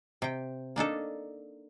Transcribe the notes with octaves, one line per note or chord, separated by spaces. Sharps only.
C3 G5
A#3 D4 D#4 A4